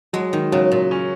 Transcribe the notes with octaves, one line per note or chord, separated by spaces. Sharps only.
F#3 G#3
D#3
C#3 F#3
A#2
C#4